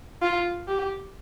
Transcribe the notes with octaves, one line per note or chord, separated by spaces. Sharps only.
F4
G4